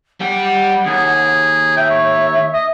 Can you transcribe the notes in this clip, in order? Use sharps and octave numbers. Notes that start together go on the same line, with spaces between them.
G3 F#5 G5
D#2 G#4
E5 G5
C#5
D#5